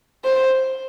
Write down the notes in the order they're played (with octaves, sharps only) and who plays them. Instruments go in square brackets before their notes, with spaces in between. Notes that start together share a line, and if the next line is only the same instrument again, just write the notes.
[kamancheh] C5